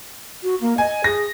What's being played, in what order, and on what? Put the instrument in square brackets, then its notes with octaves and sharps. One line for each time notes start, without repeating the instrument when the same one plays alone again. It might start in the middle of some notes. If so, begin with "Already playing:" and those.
[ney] F#4
A#3
[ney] D#5 [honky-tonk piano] G#5
[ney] G#4 [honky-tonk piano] A#6